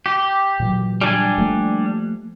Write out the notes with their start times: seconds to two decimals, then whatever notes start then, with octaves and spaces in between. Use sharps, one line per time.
0.06 G4
0.60 A#2 E3 F#3
1.01 G3 D4 G#5
1.38 F3 A3 A#3